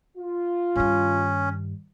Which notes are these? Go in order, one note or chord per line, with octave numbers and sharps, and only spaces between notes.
F4
G2 D#3 C#4